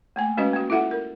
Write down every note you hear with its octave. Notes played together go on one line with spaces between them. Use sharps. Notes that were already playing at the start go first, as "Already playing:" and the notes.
A3 A#3 G#5
G#3 C#4 F#4 B4 D#5
A#3 F#4
E4 F4 A4 E5 F#5
A#4